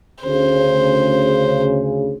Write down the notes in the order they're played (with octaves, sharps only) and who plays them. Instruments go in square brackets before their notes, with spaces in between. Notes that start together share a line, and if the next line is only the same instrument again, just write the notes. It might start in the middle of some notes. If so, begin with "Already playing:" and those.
[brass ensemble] D2 C#3 [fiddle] C5